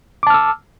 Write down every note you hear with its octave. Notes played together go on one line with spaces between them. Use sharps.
A5 D6 E6 F6